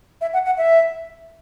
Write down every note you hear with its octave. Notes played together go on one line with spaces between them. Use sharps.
E5
F#5
F#5
E5